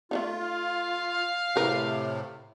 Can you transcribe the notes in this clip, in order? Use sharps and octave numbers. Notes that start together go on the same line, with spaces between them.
A3 D4 D#4 F4
F5
A2 C3 G#4 A#4 B4